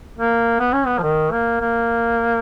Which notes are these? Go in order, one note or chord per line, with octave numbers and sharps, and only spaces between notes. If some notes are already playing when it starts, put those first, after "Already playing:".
A#3
B3
C#4
B3
F3
D#3
A#3
A#3